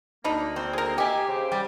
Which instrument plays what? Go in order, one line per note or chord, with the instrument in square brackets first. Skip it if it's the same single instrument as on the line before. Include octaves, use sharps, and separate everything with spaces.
[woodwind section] D2 A#3 [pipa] D4 D#4 B5
[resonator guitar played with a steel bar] C4
[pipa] G#4 A#4
[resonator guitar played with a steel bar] G4 [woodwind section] D#5 E5 [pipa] G5 G#5
[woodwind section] C#3 C5 D6
[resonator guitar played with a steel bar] G3 G4